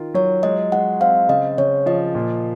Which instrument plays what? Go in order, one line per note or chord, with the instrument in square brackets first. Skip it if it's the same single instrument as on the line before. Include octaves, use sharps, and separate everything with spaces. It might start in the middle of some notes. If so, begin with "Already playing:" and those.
Already playing: [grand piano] D#3 F4
[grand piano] F#3 [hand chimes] C#5
[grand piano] G#3 [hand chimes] D#5
[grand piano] G#3 [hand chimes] F#5
[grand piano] C4 [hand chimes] F5
[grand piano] C#3 [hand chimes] D#5
[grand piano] C#3 [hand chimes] C#5
[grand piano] F3 [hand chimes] D#5
[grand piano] A#2